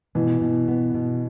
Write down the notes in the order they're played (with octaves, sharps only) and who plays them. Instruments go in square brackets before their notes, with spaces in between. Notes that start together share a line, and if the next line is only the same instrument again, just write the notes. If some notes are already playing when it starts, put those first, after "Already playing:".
[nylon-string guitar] B2 [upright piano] E3
[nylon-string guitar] B2
B3
B2